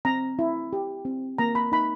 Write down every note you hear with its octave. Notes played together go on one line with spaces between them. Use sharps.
C4 A#5
E4
G4
C4
A#3 A#5
B5
D#4 B5